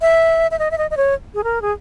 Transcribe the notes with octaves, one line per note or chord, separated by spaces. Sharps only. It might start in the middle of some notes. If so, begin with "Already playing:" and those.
E5
E5
D#5
E5
D#5
D#5
C#5
G#4
A#4
G#4